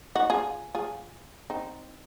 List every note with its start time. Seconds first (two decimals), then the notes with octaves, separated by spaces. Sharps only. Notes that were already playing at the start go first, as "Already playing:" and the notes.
0.15 D#4 F#4
0.30 F4 G#4
0.75 F4 G#4
1.50 C4 D#4